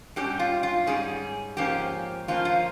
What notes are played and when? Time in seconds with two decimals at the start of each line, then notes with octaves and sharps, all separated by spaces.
0.16 G#2 G3 C#4 G4
0.39 F4
0.63 F4
0.87 G#2 G3 C#4 G#4
1.57 G#2 F3 A#3 C#4 G4
2.28 G#2 F3 A#3 C#4 F4
2.45 F4